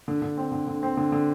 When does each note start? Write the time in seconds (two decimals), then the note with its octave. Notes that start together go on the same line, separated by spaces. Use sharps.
0.08 D3
0.22 D3
0.37 C4
0.52 D3
0.67 D3
0.83 C4
0.97 D3
1.12 D3